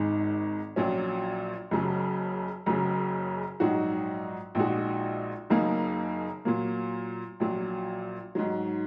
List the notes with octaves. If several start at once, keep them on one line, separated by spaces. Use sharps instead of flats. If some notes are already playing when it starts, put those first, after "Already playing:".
Already playing: G#1 G#2 D#3 G#3
A#1 A#2 F#3 C#4
F#1 F#2 C#3 F#3
F#1 F#2 C#3 F#3
A#1 G#2 F#3 D#4 F#4
A#1 A#2 G#3 D#4 F#4
F#1 F#2 D#3 A#3 D#4
A#2 F#3 A#3
A#1 A#2 F#3
G#2 D#3 F#3